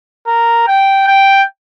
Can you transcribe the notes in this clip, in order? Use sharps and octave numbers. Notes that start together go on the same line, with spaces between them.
A#4
G5
G5